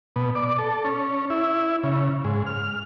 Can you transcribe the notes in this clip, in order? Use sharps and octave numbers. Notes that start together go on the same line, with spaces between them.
B2
D5
A4
C#4
E4
C#3
G#2
F6